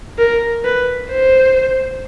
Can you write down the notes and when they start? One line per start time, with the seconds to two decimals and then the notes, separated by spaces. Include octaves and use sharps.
0.18 A#4
0.65 B4
1.10 C5